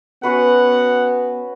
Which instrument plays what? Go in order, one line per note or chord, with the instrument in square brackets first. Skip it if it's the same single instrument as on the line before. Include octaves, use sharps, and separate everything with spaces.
[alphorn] B3 [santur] C#4 F#4 B4 [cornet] F#5